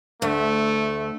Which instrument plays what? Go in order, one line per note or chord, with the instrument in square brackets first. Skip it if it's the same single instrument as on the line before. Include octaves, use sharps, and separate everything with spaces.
[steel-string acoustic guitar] D2 [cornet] A3